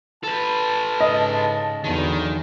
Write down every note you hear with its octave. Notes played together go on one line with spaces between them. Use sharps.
A4 B4 A5
G#2 C#3 D#5
E2 D3 D#3 F#3